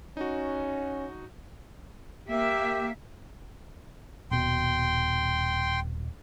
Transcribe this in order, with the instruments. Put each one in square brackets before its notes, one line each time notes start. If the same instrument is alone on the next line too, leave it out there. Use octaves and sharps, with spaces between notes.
[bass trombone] C#4 [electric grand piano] D#4 F#4
[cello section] A#3 E5 [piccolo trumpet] G4
[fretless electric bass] D#1 B2 [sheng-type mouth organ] G5 C6